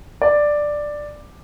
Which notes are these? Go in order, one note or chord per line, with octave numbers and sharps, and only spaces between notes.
D5